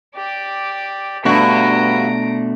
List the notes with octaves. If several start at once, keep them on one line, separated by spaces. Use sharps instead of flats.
G4 D5
G2 B2 A3 D4 F#4 A#5 D7